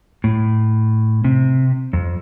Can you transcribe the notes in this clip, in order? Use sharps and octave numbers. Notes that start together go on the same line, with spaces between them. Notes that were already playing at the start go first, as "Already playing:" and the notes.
A2
C3
F2